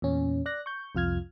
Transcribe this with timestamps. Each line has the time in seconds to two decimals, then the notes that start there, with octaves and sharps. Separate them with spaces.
0.02 E2 A#2 C#4
0.46 D5 F#6 A#6
0.66 C#6 G6
0.95 C2 F2 F4 F6 G#6